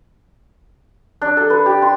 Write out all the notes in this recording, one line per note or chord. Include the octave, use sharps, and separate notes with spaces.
D4
A4
B4
G4
C6